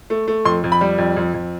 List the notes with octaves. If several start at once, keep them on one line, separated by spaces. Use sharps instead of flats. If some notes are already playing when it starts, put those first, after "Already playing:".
A3
A3
F2 C6
F2
B5
G3
F2
F2
F2